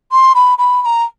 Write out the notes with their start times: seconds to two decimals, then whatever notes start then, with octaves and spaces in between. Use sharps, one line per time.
0.11 C6
0.34 B5
0.58 B5
0.82 B5
0.85 A#5